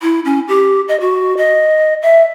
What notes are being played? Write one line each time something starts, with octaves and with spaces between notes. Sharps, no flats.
E4
C#4
G4
D#5
F#4
D#5
E5